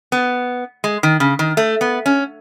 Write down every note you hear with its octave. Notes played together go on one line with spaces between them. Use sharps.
B3
G#3
D#3
C#3
D#3
A3
B3
C#4